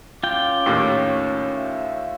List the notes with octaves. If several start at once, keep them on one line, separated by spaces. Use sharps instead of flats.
C#4 F4 G5 D6
D#2 A2
E5